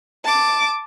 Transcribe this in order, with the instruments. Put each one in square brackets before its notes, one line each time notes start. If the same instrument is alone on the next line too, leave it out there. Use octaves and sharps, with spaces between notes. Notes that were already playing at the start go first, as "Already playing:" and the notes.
[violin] A5 D6